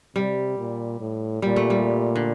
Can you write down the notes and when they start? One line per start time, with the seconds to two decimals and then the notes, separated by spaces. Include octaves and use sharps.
0.15 C3 G3
0.58 A#2
1.01 A2
1.42 A#2 G3
1.56 A3
1.70 G3
2.16 D3